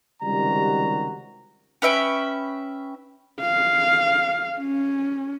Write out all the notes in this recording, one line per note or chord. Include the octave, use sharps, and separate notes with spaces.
C#2 C3 D#3 G3 F#4 A#5
C#4 B4 E5 G5
F5
C#4